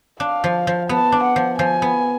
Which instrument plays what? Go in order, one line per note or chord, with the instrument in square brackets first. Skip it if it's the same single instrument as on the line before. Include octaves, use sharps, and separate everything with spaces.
[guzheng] D4 [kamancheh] F5
[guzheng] F3
F3
[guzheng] B3 [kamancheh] A5
[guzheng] D4
[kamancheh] F#5
[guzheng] F3
[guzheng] F3 [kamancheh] G#5
[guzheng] B3